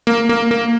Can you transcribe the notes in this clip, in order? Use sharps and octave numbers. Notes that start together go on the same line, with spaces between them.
A#3
A#3
A#3